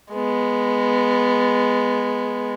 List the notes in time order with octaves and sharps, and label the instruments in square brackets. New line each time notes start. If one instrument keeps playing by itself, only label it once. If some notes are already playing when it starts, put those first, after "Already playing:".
[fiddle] G#3 B3